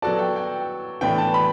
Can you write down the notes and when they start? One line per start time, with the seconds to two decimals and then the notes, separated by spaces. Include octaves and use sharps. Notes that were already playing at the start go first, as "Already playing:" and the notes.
0.02 F#3 B3 F#4 A4 D5 A5
0.19 G5
0.36 G5
1.01 A2 E3 B3 D4 G5
1.18 A5
1.34 B5